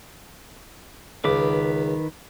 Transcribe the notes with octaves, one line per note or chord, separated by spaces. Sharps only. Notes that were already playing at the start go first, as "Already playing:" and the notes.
C#2 D#3 B4 D6